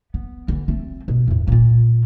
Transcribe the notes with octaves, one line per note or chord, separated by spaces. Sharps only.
B3
D3 E3
A3 C4
B2
E2 A2
A#2 F4